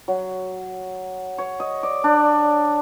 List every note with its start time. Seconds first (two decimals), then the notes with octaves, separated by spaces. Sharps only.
0.08 F#3
1.38 C#5
1.60 D#5
1.83 D5
2.04 D4